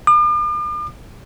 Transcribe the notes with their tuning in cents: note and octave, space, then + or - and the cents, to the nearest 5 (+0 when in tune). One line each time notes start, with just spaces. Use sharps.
D6 +45